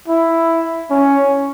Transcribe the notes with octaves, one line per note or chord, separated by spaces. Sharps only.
E4
C#4